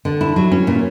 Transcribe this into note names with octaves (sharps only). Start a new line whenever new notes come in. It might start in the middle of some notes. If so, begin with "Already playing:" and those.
D3
E4
F#3
C#4
A#2